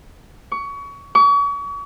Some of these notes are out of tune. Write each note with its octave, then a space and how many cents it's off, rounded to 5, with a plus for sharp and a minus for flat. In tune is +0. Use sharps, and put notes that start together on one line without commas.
C#6 +25
C#6 +40